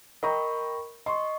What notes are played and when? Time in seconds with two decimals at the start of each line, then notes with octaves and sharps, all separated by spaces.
0.23 A#4 D#5 G5 A#5 B5 C#6
1.06 D#5 C6 C#6